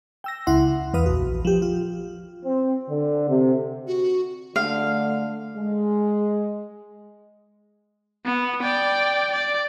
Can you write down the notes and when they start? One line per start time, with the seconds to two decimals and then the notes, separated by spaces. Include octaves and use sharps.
0.24 G5 E6 A#6
0.47 C#2 E4 F#5 C6
0.94 E2 E3 B4 F5 D#6
1.06 A#1 F#4
1.45 F3 G4
1.62 F4
2.44 C4
2.88 D3
3.29 C3
3.87 F#4
4.56 D3 A3 F5
5.57 G#3
8.25 B3
8.62 D5 G5
9.33 D5